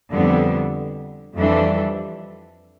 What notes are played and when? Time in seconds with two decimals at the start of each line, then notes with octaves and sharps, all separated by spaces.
0.12 F2 D3 G3 B3
1.35 F2 E3 G3 D4 A4